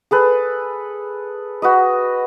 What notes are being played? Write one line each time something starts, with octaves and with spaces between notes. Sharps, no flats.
G#4 A4 B4
F#4 B4 D#5